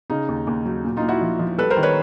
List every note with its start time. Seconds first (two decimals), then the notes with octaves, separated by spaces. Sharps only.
0.10 C#3 D#4
0.28 D#2
0.47 D#2
0.65 F#3
0.84 A#2
0.97 D#4 F4
1.02 A#2
1.08 E4 F#4
1.21 F3
1.39 F3
1.58 G3 A4 B4
1.70 A#4 C5
1.77 D#3
1.83 B4 C#5